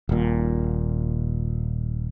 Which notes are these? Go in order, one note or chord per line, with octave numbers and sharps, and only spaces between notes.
D#1 A#2